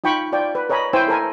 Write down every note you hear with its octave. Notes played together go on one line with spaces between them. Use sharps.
D#4 F4 G5 B5 C#6
F4 D5 G5
B4
A#4 C#5 D#5 G#5 B5
E4 C5 G5 G#5 E6
A4 A#4 G#5